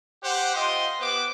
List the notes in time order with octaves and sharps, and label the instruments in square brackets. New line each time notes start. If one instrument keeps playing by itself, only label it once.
[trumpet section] G4 C5 F#5
F4 D#5 G5 C6
B3 G4 B4 C5 D6